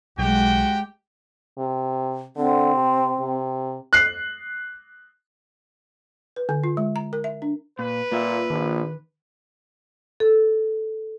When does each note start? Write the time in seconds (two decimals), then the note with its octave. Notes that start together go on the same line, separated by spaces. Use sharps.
0.19 B1 G#3 F#4 G4 G5
1.59 C3
2.37 D3 C4
2.75 C3
3.20 C3
3.93 F#6 C7
6.36 B4
6.49 D3
6.64 F4
6.77 G#3
6.96 A#5
7.13 A#4
7.24 E5
7.42 D4
7.79 A#2 B4
8.12 A#2 A#3 F4 E5
8.50 A#1 D#3
10.20 A4